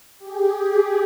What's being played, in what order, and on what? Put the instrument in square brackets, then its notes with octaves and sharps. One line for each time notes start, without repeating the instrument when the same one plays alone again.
[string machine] G4 G#4